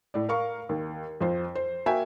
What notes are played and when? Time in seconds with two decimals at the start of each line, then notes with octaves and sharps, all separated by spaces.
0.14 A2 D5
0.29 A#4 F5 C#6
0.69 D#2
1.21 F2 F4 C5
1.55 C5
1.86 A#3 F#4 E5 G5 G#5